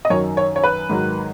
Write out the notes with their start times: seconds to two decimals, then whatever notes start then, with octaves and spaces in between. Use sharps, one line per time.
0.05 D#5
0.10 F#2 D#3 F#3 C#5
0.37 C#5
0.56 C#5
0.64 B4
0.90 G#2 D#3 F#3